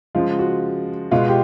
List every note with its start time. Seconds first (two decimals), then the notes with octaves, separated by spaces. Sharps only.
0.15 C#3 F3 G#3 F4
0.39 F#4
1.11 B2 G#3 B3 F4
1.28 G4